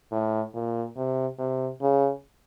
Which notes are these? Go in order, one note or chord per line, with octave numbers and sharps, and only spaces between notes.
A2
A#2
C3
C3
C#3